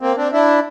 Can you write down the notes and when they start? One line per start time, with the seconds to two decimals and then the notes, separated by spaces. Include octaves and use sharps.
0.01 A#3 C4
0.17 C4 D4
0.32 D4 E4